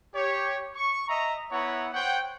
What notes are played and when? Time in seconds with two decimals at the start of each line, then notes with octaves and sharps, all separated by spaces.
0.13 G4 C#5
0.74 C#6
1.08 D#5 E5 A#5
1.51 B3 E4 C#5 F#5 A#5
1.92 C5 C#5 F#5 G5